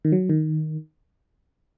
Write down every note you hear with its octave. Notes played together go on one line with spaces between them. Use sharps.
D#3
F#3
D#3